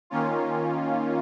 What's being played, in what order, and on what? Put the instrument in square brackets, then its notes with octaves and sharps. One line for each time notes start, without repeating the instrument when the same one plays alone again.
[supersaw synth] D#3 A#3 C#4 F4